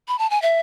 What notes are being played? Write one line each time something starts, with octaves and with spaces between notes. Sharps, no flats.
B5
A5
G#5
E5